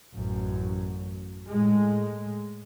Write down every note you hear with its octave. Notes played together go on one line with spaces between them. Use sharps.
A1 F#2
A2 G#3